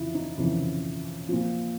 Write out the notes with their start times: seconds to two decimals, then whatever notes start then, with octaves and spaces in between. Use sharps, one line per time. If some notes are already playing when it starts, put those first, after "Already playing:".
Already playing: F2 C#3 E3 E4 F4
0.14 D#4
0.37 F2 C#3 E3 E4
1.29 A#2 F3